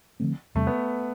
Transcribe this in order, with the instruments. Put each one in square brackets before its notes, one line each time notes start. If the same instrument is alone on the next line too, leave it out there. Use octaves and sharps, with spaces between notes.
[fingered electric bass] D3 F3 A3 C4
[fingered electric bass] E2 C3 G3 C4 [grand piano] A3
[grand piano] B3